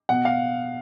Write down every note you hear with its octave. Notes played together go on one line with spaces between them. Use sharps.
B2 F#5
F5